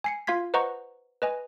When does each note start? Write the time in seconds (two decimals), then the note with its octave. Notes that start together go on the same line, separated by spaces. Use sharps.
0.04 G#5 C7 C#7
0.27 F4 F5 C6 G#6 B6
0.54 B4 C5 D#5 F#5 A#5 C#6
1.22 B4 D#5 G#5